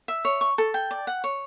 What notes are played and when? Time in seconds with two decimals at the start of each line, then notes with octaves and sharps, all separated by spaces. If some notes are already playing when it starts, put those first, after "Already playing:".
0.08 E5
0.25 C#5
0.41 C#6
0.58 A4
0.74 G5
0.91 D5
1.07 F#5
1.24 C#5